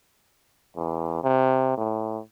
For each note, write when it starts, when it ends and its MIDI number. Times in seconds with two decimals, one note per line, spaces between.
0.76 1.22 40
1.23 1.74 48
1.77 2.19 45